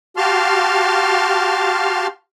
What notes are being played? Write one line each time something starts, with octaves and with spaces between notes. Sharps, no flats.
F#4 G4 F5 A5 C6 F6